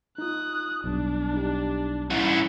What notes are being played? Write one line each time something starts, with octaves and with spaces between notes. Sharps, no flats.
D#4 F4 D#6 F#6
B1 G2 D4
D#4 G4
E3 G3 C#4 D#4 F#5 A6